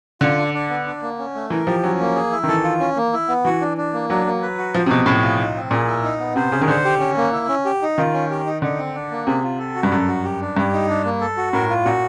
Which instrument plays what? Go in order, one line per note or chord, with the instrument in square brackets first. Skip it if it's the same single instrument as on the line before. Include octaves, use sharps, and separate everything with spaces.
[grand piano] D3 [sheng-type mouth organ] F4
[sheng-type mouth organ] D4
D4
B3
D4
A#3
C#4
A3
[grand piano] E3 [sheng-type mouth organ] A#4
[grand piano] F3 [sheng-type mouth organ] G4
[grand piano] F#3 [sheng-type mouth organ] C#4
[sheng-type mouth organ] A#3
G#4
E4
[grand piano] D#3
[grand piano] E3 [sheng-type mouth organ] A4
[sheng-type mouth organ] F4
C#4
A#3
E4
B3
[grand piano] E3 [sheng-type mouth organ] F#4
[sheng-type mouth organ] D4
D4
A#3
[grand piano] F#3 [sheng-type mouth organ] D4
[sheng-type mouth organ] A#3
B4
F#4
[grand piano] F3 [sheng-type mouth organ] C5
[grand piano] C3
[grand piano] B2 [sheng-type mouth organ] G#4
[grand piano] A2 [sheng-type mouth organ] G#4
[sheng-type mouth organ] F4
D#4
C4
[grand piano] A#2 [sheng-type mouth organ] G#4
[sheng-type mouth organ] E4
D#4
B3
[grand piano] C3 [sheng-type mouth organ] C5
[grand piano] C#3 [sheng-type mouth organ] G#4
[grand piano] D#3
[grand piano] D3 [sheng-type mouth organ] C5
[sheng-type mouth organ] G4
C#4
A#3
E4
C#4
G4
D#4
[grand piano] D#3 [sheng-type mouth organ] F4
[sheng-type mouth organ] C#4
G4
D#4
[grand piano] D3 [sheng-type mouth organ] D#4
[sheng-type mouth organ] C4
D4
A#3
[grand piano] C3 [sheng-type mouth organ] G#4
[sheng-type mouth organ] F4
A4
F#4
[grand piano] G2
[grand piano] F#2 [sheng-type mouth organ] A4
[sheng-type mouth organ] F#4
G4
D4
[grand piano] G2 [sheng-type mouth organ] G4
[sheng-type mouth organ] D#4
D4
A#3
A4
F#4
[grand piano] A2 [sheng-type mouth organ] A#4
[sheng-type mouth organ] F4
[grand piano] A#2 [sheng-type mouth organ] F#4